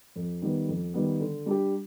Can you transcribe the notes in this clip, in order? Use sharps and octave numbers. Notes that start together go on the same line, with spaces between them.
F2
D#3 G3 B3
F2
D#3 G3 B3
D3
G3 D4 G4